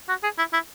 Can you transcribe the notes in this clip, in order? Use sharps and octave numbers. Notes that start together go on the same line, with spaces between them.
F#4
G#4
E4
E4